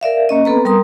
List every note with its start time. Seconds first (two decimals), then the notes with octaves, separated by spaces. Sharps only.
0.01 A#4 D5 E5 F5
0.29 A#3 C#4 D#5
0.45 B3 C4 A4 B4 A#5
0.65 G3 A#4 A#5 C6 D#6